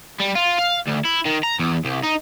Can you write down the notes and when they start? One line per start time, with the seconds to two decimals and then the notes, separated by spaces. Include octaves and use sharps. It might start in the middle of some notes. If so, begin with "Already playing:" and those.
0.20 G3
0.35 F4
0.59 F5
0.87 D2
1.05 E4
1.26 D#3
1.43 A#5
1.59 E2
1.85 C2
2.03 D#4